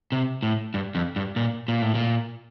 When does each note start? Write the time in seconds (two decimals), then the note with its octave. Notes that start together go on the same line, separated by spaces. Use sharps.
0.12 C3
0.43 A2
0.74 G2
0.95 F2
1.16 G2
1.36 A#2
1.68 A#2
1.82 A2
1.95 A#2